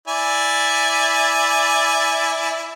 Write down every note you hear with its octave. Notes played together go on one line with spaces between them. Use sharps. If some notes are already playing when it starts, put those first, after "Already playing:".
E4 D5 G#5